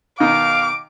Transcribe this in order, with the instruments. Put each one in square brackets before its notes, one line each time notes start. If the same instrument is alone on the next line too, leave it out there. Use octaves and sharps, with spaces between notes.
[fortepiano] B2 D#3 D#4 [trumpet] F5 [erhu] D6